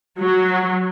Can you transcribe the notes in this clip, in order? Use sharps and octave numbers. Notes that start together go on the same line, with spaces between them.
F#3